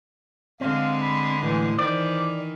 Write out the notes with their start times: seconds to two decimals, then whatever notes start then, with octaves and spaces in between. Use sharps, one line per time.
0.61 D3 G#3 C4 F5
1.01 B5
1.43 A2 E3
1.79 D#3 E3 C5 D5